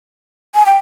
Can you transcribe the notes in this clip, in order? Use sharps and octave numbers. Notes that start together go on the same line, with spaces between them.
G#5
G5